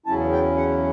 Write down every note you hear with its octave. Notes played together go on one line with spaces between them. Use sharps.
E2 C#3 F#3 C#4 E4 A5
G5
F#5